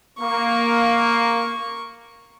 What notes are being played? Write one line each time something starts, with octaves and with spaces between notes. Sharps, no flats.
A#3 C#6